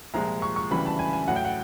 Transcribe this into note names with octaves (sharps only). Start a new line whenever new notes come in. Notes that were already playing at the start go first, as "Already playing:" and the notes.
C2 A#2 F3 G#3 A#5
C#6
C#6
D2 C#3 E3 G3 B5
A5
G#5
G#5
A2 F#3 F#5
G5
F#5